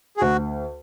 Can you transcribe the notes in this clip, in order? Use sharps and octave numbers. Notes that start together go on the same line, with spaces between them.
G#4
D2 F#4